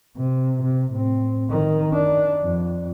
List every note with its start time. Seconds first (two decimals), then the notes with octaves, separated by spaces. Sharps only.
0.17 C3
0.62 C3
0.92 A2 C4
1.49 D#3
1.93 D4
2.42 F2